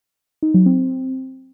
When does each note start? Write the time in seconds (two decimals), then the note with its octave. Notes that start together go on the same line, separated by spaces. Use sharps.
0.42 D#4
0.54 F#3
0.66 C4